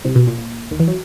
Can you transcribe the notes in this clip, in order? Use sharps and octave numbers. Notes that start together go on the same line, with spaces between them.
C2 C3
B2
A#2
A#2
D#2 D#3
E3
F#3